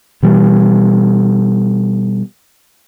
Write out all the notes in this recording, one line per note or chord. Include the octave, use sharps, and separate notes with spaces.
B2 E3 G3